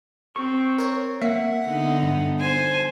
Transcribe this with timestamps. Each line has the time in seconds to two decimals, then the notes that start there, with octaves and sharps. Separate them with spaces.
0.36 C4 C#6
0.78 A#4 C#5
1.22 A#3 E5 F#5
1.66 D3 B3 D#4
2.03 G2
2.41 C5 G#5